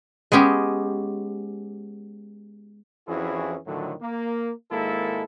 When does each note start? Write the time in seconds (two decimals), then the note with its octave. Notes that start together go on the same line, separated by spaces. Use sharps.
0.32 G#3 B3 C#4 G4
3.08 F2 E3 C#4 E4 F#4 G#4
3.67 A2 D3 D#3 F3 F#3
4.02 A#3
4.72 G#1 G#3 A#3 E4 A4